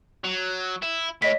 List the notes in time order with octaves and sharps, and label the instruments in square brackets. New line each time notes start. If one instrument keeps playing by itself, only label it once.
[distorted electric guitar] F#3
E4
[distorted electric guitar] A2 [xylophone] C#5 D#5 B6